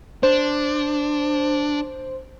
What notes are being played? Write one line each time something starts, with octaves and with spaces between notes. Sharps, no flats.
D4 C5